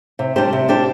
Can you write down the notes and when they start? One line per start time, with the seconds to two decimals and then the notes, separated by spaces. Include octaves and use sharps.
0.19 C3
0.36 G3 D4 G4 C5
0.53 C3
0.69 G3 D4 G4 C5